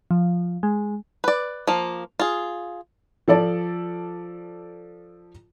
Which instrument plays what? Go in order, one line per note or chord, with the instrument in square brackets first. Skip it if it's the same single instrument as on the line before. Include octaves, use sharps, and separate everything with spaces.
[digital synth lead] F3
G#3
[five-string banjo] B4 D5
F3 A#3
F4 G#4
[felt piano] F3 A4 D5 A5